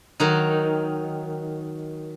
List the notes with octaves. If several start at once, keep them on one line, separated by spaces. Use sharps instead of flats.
D#3 F#3 D#4